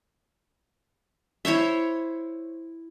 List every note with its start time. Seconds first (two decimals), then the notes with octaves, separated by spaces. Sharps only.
1.45 E4 C5 C#5 E5